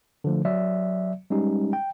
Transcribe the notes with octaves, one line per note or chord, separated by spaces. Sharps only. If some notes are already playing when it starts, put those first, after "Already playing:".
D3 F3 A3
F#3 D5 E5
G3 G#3 C#4 D#4 G4
G5